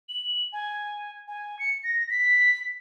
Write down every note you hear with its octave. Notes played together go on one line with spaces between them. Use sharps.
F#7
G#5
G#5
C#7
A#6
B6